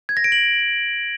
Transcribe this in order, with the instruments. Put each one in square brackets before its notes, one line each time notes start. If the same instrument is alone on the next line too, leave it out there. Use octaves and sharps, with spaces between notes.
[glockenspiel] G#6
A#6
D7
F#7